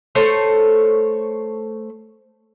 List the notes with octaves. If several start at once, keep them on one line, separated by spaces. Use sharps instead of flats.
A3 C5 C#5